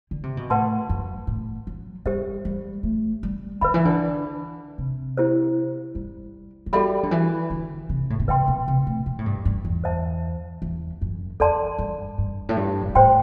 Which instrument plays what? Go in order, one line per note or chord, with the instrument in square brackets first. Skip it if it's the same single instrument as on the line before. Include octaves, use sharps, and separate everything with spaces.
[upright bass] D3
C3
B2
[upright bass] A2 [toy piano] B4 F#5 A5 C6
[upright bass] F#2
A2
F#3
[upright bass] G3 [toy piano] G4 C5 E5
[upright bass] G3
A3
G3
[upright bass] D3 [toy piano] B4 E5 B5
[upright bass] E3
D3
C3
[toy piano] E4 G4 C5
[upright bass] G3
F#3
[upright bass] G3 [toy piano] F#4 A4 E5 B5
[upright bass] D3
E3
D3
C3
A2
B2
[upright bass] C3 [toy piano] B4 E5 G5 C6
[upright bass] B2
C3
A2
B2
A2
G2
G2
E2
[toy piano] C5 E5 A5
[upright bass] E2
F#2
[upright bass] E2 [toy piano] A4 D5 A5 C6
[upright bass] G2
G2
A2
G2
F#2
G2
[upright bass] A2 [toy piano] C5 G5 C6